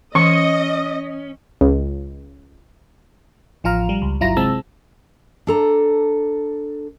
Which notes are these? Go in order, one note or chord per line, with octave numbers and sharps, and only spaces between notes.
E3 C#4 D#5 C#6
C#2
A1 F3 F4 F5 A#5 F6
G3
C#2
G1 F#3 E4 F4 A#5 A#6
C3 G#3 C4 A5 E6
D4 A4 A#5